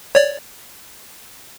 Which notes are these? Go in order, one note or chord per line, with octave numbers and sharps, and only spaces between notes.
C#5 D5